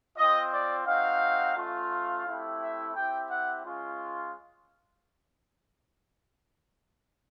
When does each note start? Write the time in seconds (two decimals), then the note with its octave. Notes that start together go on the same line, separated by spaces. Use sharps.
0.17 C4 F4 D#5
0.52 D5
0.87 C4 D#4 F#4 F5
1.56 A3 C#4 F4
1.91 F5
2.25 A3 C4 E4 G4
2.60 E5
2.95 C4 E4 G4 G5
3.29 F#5
3.64 G#3 C#4 F4